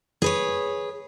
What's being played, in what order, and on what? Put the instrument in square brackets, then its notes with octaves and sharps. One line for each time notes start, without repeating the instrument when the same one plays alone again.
[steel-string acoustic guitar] G#4 B4 C#5